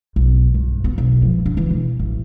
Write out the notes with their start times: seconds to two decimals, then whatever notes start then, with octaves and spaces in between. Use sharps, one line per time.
0.16 B1
0.54 G2
0.84 B3
0.98 B1
1.22 F3
1.46 D4
1.57 E3
1.71 E1
1.99 A1